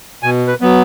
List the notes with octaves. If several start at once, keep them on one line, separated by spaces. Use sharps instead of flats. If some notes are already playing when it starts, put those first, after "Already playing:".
B2 G#5
B4
F#3 B3